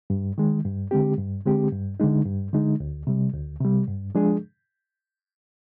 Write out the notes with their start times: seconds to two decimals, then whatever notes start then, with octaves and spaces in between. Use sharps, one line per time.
0.10 G2
0.38 D#3 G#3
0.65 G2
0.91 D3 G#3 C4 G4
1.18 G2
1.45 D3 G#3 C4 G4
1.72 G2
2.00 D3 G#3 D#4
2.26 G2
2.53 D3 G#3 D#4
2.80 D2
3.07 C3 G3
3.33 D2
3.61 C3 G3
3.88 G2
4.15 F3 G#3 D4 G#4